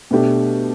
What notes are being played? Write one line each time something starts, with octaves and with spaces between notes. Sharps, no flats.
B2 A3 D4 G4